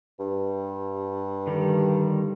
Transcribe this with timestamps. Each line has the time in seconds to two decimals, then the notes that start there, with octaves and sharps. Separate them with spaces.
0.20 G2
1.47 D3 D#3 G3